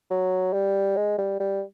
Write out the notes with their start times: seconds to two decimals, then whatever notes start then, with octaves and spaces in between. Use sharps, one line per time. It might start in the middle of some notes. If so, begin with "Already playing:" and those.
0.11 F#3
0.54 G3
0.97 G#3
1.18 G3
1.40 G3